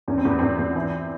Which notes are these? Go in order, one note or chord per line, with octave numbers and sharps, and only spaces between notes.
E2 C#4
C4
E2 B3
E2 C4
E2
E3